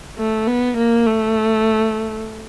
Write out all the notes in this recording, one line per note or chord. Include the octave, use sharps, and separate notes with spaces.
A3
B3
A#3
A3